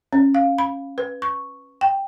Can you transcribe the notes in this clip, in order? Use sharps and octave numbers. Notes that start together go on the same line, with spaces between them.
C#4
F5
B5
B4
C#6
G5